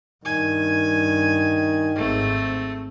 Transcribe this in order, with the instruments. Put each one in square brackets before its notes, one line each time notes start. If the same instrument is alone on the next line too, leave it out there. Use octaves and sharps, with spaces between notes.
[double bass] G2 [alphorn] D#3 [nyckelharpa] G#5
[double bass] G#1 G#2 [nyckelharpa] A3 C4